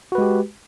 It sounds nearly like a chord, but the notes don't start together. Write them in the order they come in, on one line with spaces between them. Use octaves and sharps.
F#4 B4 G#3 G4